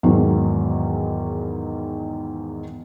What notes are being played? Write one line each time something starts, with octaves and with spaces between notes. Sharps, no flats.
E2 G#2 D#3 F#3